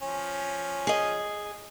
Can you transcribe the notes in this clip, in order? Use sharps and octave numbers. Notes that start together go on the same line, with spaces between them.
F3 C#4
G#4 D#5